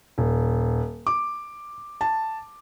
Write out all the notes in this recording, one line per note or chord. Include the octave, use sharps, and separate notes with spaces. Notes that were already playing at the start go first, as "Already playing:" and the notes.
D#1
D6
A5